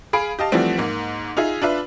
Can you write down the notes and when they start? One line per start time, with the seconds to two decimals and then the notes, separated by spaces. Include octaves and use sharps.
0.13 G#4 F5 B5 D7
0.39 G4 D#5 F5 A5
0.52 E3 F3 G3 A3 C4 F#4
0.78 G#2 A#3
1.37 D#4 F4 G#4 E5
1.62 D4 F4 B4 E5